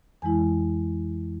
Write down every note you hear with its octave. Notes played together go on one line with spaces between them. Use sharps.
F2 E3 G#3 E4 G#5